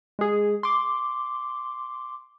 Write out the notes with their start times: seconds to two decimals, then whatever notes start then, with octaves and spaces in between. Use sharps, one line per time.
0.19 G#3 G#4
0.63 C6 D6